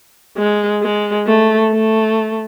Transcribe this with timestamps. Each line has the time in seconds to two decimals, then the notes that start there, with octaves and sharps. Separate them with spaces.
0.37 G#3
0.83 G#3
1.27 A3
1.71 A3